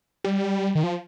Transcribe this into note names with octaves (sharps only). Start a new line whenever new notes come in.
G3
D#3
F3